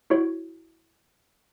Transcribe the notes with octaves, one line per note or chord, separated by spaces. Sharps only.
E4 F#4 C#5